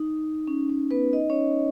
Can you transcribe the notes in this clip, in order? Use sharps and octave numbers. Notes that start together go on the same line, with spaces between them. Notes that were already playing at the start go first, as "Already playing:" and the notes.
Already playing: D#4
C#4
C#4
B3 B4
D#4 D#5
C#4 C#5